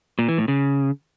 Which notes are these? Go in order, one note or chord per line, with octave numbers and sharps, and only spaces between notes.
A#2
E3
A2
C#3